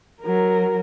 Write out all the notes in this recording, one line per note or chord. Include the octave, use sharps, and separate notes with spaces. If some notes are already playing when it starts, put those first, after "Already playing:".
F#3 A#4